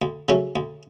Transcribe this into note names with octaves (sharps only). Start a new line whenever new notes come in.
D2
C#3 F#3 A3 C#4
D2